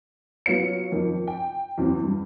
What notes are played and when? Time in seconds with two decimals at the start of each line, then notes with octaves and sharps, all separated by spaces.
0.46 F#3 B3 F4 C#5 C#7
0.92 F2 D#3
1.27 G5
1.78 E2 F#3 C4
2.04 G2